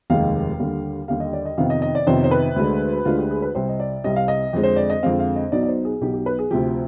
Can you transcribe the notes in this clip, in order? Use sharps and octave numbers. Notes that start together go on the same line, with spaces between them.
F1 D#2 D#3 G#3 F5
D#2 D3 G3
D#2 D3 G3 F5
D#5
D5
D#5
F2 C3 D#3 B3 D#4 F5
D#5
D#5
D5
F2 C3 D#3 B3 D#4 C5
C5
B4
D2 D3 G#3 D4
D2 D3 G#3 D4 F4
G4
G#4
B4
C2 C3 G3 C4 C5
D#5
D5
C2 C3 G3 C4 D#5
F5
D#5
F2 D3 G#3 C4
C5
D5
D#5
F2 D3 G#3 C4 F5
F5
D#5
B1 B2 B3 D#4 D5
D5
C5
G#4
B1 B2 B3 D#4 G4
G4
B4
G#4
D2 C3 F3 G4